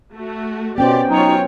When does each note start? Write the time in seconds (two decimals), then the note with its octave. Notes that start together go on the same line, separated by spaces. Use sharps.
0.14 A3 F#4
0.78 B2 B3 C#4 G4 C5 D5 G5
1.09 F#3 D#4 F4 C#5